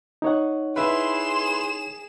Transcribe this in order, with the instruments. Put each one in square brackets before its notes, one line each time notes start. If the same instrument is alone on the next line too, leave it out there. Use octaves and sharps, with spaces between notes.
[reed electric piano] D#4 C#5 F#5
[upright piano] E4 B4 [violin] G#4 E7 [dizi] C6